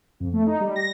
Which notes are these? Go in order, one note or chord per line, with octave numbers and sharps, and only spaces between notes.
F2
A3
D#4
G3
A#6